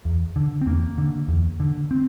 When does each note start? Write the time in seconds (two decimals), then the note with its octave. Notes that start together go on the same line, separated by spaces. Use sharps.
0.05 E2
0.36 D3
0.61 C4
0.66 E2 A#3
0.98 D3
1.28 E2
1.60 D3
1.91 C4